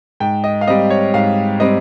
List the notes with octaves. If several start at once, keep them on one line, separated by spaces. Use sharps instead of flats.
G#2 G5
D#5
F5
G3 C4 D#5
C#5
G#2 F5
G3 C4 D#5